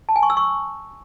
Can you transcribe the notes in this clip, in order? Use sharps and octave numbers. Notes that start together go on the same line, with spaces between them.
A5
G#5
C#6
E6
C#6